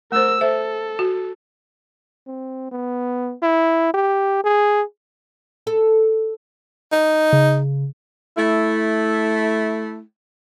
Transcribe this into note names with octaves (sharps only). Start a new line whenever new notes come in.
A3 A#4 C5 E6
A4 C5 E5
F#4
C4
B3
E4
G4
G#4
A4
D#4
C#3
A3 E4